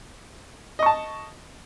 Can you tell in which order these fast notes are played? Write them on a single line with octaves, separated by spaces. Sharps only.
D#5 C#6 A5